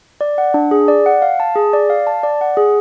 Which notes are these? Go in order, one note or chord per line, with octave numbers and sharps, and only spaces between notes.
D5
F#5
D4
G#4
D5
F#5
F5
A5
G#4
D5
F5
A5
D5
F#5
G#4